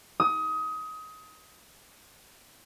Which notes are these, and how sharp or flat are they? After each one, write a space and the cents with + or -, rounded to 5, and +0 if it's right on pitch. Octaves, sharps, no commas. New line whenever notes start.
D#6 +25